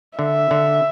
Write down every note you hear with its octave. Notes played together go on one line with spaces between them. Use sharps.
D3 E5
D3